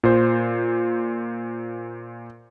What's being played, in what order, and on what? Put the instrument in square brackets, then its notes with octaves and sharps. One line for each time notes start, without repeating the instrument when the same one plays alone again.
[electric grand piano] A#2 C5